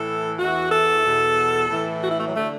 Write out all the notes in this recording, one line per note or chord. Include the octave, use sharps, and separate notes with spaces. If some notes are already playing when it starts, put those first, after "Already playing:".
Already playing: A2 E3 A4
E2 E3 F#4
A4
E2 B2
A2 E3
F#4
E4
A3
F#3
D3 A3